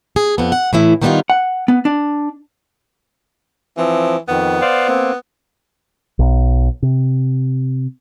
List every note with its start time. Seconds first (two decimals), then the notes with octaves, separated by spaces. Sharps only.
0.16 G#4
0.38 F2 B3
0.52 F#5
0.73 A2 E3 E4
1.02 D#3 G3 B3 D4 D#4 F4
1.30 F#5
1.68 B3
1.85 D4
3.77 E3 F3 C4
4.29 F2 D#3 B3
4.61 C5 D5 F5
4.88 A#3 C4
6.19 B1
6.82 C3